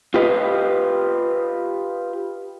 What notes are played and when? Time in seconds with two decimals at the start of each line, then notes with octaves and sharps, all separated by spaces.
0.14 F4 G4 B4 D#5